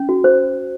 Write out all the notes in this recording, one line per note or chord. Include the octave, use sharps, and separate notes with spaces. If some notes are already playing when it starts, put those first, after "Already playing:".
Already playing: C#4
F#4
C5